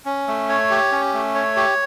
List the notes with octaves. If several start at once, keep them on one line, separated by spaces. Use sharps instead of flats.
C#4
A3
C#5
G4
C#4
A3
C#5
G4